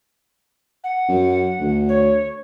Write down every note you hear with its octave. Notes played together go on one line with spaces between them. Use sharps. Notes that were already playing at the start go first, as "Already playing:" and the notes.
F#5
F#2
D2
C#5